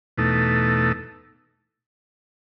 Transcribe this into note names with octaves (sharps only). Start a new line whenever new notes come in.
E2 B2 A3 D#4 A4